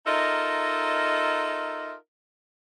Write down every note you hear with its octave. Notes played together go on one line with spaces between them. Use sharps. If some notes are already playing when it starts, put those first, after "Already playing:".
D#4 F4 A4 A#4 D#5 E5